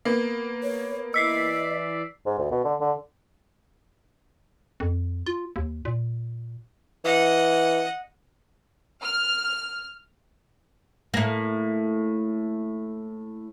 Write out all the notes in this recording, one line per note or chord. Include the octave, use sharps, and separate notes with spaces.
A#3 B3
C#5
E3 D5 D#5 E6 B6 C7
G#2
D2
B2
D3
D3
F2
F4
D#2
A#2
E3 D#5 F#5
F6
A2 A#3